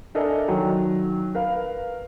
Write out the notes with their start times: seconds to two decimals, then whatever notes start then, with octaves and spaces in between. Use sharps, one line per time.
0.15 D4 A4 A#4 D#5 E5 G#5
0.47 D#3 F#3 G5
1.35 A#4 B4 F5